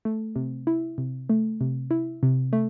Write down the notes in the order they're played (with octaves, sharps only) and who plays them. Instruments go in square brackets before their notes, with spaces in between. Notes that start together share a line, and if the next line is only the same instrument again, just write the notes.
[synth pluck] A3
C3
E4
C3
A3
C3
E4
C3
A3